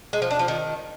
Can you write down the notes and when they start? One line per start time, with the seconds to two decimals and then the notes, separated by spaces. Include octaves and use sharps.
0.13 G#3
0.22 F3
0.31 D4
0.39 F3
0.48 D#3